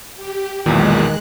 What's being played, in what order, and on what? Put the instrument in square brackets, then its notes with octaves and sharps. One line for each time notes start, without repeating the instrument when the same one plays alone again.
[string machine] G4
[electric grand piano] B1 E2 A#2 [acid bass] D#3 [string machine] G#3 F#6